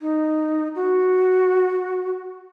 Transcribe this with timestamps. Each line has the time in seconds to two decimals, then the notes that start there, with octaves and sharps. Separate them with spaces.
0.01 D#4
0.75 F#4